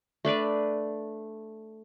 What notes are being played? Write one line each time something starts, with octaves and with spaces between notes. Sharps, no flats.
A3 D4 B4 D5